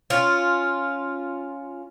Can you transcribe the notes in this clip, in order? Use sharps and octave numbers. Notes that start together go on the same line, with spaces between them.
C#4 F4